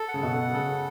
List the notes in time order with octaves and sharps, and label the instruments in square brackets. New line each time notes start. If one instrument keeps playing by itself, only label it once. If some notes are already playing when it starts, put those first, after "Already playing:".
Already playing: [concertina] A4
F#5
[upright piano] C#3
B2
[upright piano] C#3 [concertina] A4